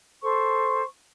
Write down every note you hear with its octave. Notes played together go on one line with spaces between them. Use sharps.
A4 C5 C#6